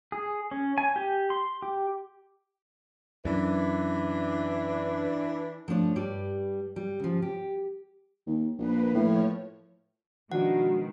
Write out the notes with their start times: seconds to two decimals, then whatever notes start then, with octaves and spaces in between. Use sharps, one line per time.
0.12 G#4
0.51 C#4
0.78 G#5
0.96 G4
1.30 C6
1.62 G4
3.25 F#2 E3 D4
5.68 F3 A3 D4 C#5
5.96 G2 G3 D5
6.76 G3
6.99 C#3 F3
7.22 G4
8.27 D#2
8.59 A#1 A#3 B4
8.94 A2 F3 C#5
10.32 B2 D#3 F3 G#3 D4 F#4 F#5